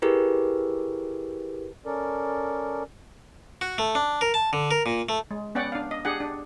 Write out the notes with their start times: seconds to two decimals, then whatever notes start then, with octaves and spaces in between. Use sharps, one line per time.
0.02 E4 G4 G#4 A#4 B4
1.86 C#4 A4 A#4 D5
3.61 F#4
3.78 A3
3.95 D4
4.21 A#4
4.34 A5
4.53 D3
4.71 A#4
4.86 A#2
5.09 A3
5.31 G#3
5.55 B3 C#4 D5 F#5 G5
5.72 D4 F5
5.91 D#5
6.05 D4 G4 G#4 F#5
6.20 D4